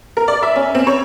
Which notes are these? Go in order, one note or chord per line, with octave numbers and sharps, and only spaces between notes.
A#4
D5
E5
C#4
C4
C#5